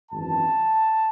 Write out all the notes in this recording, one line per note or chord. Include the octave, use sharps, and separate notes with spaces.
G#1 F#2 E3 A5